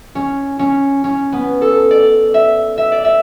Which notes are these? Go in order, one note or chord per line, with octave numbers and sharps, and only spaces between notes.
C#4
C#4
C#4
B3
A4
D5
E5
E5
D5
E5